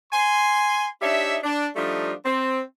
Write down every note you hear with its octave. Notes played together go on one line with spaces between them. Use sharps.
G#5 C6
D4 D#4 G4 C#5 E5
D4
F3 G3 A3 D4 D#4 F4
C4